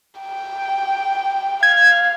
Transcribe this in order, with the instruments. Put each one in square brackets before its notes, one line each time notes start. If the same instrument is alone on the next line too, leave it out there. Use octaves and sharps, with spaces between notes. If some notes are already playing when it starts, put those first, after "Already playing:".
[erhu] G5
[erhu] F5 [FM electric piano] G#6